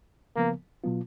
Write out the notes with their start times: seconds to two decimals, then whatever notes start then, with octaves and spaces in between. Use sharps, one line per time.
0.36 C#3 F3 A#3 B3
0.84 B2 F#3 B3 F4